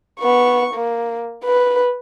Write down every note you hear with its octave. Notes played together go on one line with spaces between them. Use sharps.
B3 C#6
A#3
B4